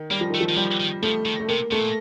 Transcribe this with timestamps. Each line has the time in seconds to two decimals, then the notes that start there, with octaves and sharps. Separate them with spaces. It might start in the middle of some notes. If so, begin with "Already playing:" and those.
Already playing: D#3
0.11 G3 A#3
0.21 F3
0.30 D#3 A3
0.41 F3
0.49 D#3
0.56 F3 G3
0.80 D#3
1.02 F3 A3
1.26 D#3
1.40 A3
1.48 C3 A#3
1.71 C3 A3
1.79 A#2